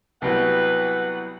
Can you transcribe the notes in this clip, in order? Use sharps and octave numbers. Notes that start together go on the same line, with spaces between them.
C2 F#3 B3 E4 G4 B4 F#5 G5